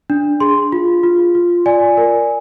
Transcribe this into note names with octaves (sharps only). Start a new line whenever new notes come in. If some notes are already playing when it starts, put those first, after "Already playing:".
D4
G#4 C6
F4
F4
F4
D5 G#5
A#4